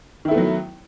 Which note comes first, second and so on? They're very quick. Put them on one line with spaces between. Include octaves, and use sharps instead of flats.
D#3 E4 A3 B3 F#3